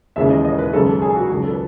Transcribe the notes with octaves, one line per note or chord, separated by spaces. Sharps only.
D#2 C#3 E3 G#3 E5
D#5
D#5
B4
G#1 F#2 C#3 G#3 A4
A4
G#4
F#4
C#2 C#3 F#3 G#4
A4
B4